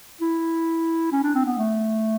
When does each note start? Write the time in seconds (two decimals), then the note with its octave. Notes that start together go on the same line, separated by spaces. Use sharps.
0.21 E4
1.12 C#4
1.23 D4
1.35 C4
1.45 B3
1.58 A3